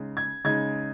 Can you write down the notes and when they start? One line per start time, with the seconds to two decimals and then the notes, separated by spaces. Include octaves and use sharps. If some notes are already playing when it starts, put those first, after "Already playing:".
Already playing: C#3 G#3 D#4
0.17 G#6
0.44 C#3 G#3 D#4 G#6